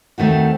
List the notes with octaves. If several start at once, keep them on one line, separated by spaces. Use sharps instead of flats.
D#2 D#3 A3 C4 F#4